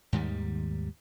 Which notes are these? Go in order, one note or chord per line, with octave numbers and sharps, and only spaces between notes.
D#2 G#2 D#3 G3